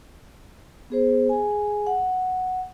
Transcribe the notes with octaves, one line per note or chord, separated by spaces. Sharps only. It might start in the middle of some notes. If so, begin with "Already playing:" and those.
B3 G#4 C5
G#4 G#5
F#5